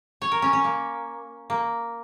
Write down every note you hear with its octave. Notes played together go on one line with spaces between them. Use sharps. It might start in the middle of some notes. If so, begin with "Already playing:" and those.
C#5
A#4
C#4
C#4
A#3
A#3